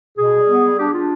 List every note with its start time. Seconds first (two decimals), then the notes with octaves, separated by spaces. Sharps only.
0.17 B2 G#4
0.33 G3
0.48 B3
0.63 G3
0.78 D4 G4
0.93 D4 F4